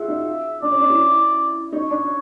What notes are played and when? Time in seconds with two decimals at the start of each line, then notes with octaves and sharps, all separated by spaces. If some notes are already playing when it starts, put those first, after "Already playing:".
Already playing: F4 F#4 G#4 E5
0.08 D#4
0.62 D4 D5
0.71 C#4
0.81 D4
0.90 E4
1.72 D#4 C#5
1.91 D4